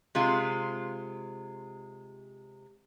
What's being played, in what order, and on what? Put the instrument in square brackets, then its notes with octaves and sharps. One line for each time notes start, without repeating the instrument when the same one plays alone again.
[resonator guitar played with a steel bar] C3 G#3 F4